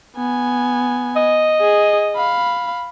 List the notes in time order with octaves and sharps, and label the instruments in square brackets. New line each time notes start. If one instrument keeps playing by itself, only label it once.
[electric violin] B3 G#5
[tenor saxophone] D#5
[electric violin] G#4
F5 B5